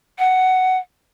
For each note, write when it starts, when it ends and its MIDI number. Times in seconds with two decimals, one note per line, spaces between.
0.19 0.78 78